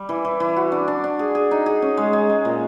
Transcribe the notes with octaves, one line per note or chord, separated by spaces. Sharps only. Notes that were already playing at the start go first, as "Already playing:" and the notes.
Already playing: G3
E3
E3
E3
F#4
D4
D4
D4
G#4
G#4
D#4
G#4
C#4
G#3
G#3
G#3
A#2